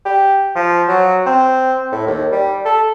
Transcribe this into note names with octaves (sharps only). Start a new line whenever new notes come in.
G4
F3
F#3
C4
A2
D#2
G3
A4